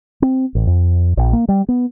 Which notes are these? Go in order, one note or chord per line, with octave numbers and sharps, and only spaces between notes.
C4
A1
F2
A#1
A#3
G3
B3